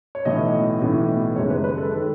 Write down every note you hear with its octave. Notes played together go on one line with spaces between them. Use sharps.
C#5
B1 A2 E3 B3 D#5
B1 A2 E3 B3
F#1 F#2 D#3 G#3 C#5
B4
B4
A4
D#3 G#3 A4